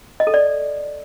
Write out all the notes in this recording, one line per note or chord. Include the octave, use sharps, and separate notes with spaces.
D#5
A4
D5